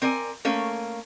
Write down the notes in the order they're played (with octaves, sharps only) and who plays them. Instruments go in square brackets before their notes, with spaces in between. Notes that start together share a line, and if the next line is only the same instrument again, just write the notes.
[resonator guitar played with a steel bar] C4 A#4 D5 G#5
A3 A#3 C#4